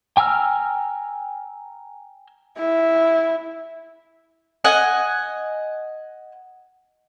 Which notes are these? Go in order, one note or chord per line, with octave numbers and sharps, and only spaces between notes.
G5 G#5 A#5 E6 F6
E4
D#5 F#5 G#5